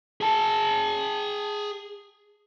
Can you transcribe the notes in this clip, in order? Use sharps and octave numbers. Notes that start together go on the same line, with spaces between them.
G#4 A5